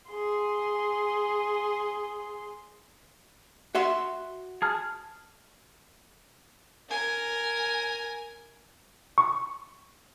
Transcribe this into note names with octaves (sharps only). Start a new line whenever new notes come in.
G#4 C6
F#4 E5 C6
G#4 A5 F6
A#4 G#5
C#6